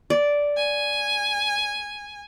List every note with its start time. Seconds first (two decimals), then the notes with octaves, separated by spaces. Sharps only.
0.10 D5
0.57 G#5